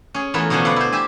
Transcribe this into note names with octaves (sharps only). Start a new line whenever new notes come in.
C#4 G#4
E3 A3 B3 F4 A#4 B4
B2 D3 F3 F#3 C#4 D4
B4 D5 F5 F#5
E4 C5
G4 E5 G#5